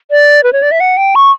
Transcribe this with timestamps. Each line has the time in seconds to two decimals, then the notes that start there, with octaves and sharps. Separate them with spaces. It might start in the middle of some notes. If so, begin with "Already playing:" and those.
0.11 D5
0.44 B4
0.53 C#5
0.62 D5
0.71 E5
0.80 F#5
0.97 G5
1.15 C#6